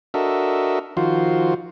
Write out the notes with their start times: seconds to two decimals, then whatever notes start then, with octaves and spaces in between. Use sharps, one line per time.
0.14 D4 F#4 A4 A#4 D#5 E5
0.97 D#3 F3 F4 F#4 C5